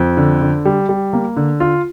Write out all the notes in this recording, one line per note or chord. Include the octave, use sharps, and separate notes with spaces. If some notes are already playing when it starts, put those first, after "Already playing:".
Already playing: F2
D3
D3
G3
G3
A#3
D3
F4